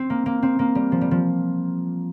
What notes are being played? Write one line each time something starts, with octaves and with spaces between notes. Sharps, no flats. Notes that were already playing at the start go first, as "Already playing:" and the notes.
Already playing: C4
A#3
A#3
C4
A#3
G3
F3
G3
F3